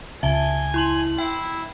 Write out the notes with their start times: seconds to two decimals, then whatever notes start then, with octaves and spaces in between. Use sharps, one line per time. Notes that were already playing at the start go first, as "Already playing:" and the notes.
0.23 C#2 E5 G#5 A5 G7
0.74 E4 C6 F#7
1.18 E4 G5